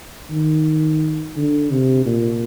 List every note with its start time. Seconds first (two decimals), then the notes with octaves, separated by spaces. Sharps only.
0.30 D#3
1.36 D3
1.71 C3
2.06 A#2